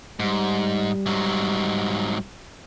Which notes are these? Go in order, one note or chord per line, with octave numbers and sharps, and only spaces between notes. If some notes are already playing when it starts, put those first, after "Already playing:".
G#2 G3
G#2 F#3